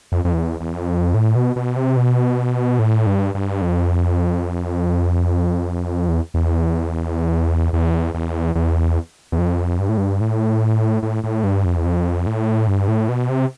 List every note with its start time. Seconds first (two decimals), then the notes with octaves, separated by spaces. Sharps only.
0.12 F2
0.25 F2
0.33 E2
0.61 E2
0.74 F2
1.14 A2
1.36 B2
1.56 B2
1.76 C3
1.97 B2
2.79 A2
3.07 G2
3.35 G2
3.62 F2
6.08 E2
6.34 E2
7.73 E2
8.15 E2
8.55 E2
9.32 E2
9.38 F2
9.79 G2
9.89 A2
9.98 G2
10.21 A2
11.03 A2
11.24 A2
11.44 G2
11.65 F2
11.77 E2
11.85 F2
12.26 A2
12.68 G2
12.88 A2
13.09 B2
13.29 C3